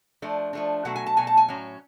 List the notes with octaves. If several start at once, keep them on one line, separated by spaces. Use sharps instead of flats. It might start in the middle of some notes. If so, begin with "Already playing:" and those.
F3 A3 D4
F3 A3 D4
B2 F#3 A3 F#5
G#5
A5
B2 F#3 A3 G#5
A5
G#5
A2 F#3 C#4